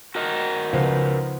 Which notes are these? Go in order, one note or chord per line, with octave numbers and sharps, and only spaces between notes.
F#4 A#4 D#5
C#2 F3 B3 D#4